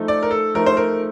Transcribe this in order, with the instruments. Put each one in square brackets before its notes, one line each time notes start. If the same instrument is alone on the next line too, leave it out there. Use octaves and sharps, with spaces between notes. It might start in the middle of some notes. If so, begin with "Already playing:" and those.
Already playing: [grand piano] F3 A3 D#4 A4
[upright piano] D5
A#4
A4
[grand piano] F3 A3 D#4 A4 [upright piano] A#4
[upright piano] C5
A#4